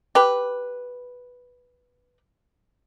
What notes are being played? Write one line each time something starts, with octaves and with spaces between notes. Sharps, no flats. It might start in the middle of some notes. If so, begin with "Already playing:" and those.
G4 B4